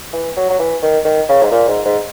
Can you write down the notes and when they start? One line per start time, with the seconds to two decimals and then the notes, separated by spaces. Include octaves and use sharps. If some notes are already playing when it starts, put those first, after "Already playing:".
0.13 E3
0.37 F#3
0.50 F#3
0.59 E3
0.82 D#3
1.05 D#3
1.29 C#3
1.43 G#2
1.51 A#2
1.68 G#2
1.85 G#2